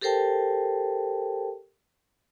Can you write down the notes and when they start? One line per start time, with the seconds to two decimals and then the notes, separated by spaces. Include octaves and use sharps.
0.01 G4 A4 A#4 C5 G5 A5